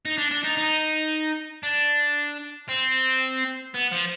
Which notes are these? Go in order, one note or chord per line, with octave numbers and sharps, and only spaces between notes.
D#4
D4
D4
D#4
D#4
D4
C4
B3
F3